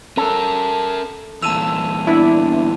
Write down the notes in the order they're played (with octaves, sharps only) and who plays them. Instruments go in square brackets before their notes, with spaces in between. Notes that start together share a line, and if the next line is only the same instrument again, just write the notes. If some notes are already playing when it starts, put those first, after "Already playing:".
[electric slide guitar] C#4 A#4 [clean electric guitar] A4
[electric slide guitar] E2 A#2 [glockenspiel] A5 D#7 F7 [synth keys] E6
[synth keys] B3 D4 E4